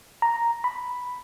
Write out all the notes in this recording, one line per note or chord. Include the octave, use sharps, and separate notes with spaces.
A#5
B5